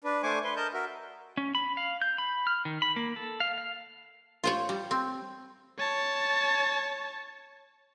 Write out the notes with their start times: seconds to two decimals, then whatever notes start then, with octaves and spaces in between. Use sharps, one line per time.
0.04 D4 B4
0.23 A3 D4 C5 G#5 C#6 D6
0.44 B4 C6
0.56 A#4 D#5 A5 G6
0.73 F#4 A#4 E5
1.37 C#4
1.55 B5
1.77 F5
2.02 G6
2.18 B5
2.47 F6
2.65 D#3
2.82 B5
2.96 A#3
3.16 A4
3.40 F5
3.58 F5
4.44 F4 C5 C#5
4.69 G3
4.91 C4
5.79 C#5 A5